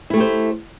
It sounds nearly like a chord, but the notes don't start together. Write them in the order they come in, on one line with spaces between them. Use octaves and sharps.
E4 A3 G4 C5